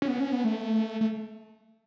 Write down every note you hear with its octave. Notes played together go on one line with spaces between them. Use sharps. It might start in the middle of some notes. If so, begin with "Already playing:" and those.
C#4
B3
C#4
B3
A3
A3